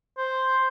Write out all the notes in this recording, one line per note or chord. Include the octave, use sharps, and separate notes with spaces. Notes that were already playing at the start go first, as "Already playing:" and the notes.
C5